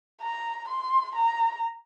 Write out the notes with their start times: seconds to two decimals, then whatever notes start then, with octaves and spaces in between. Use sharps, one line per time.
0.22 A#5
0.69 C6
1.15 A#5